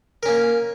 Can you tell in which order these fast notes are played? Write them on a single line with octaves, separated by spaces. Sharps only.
A#4 C#4 A#3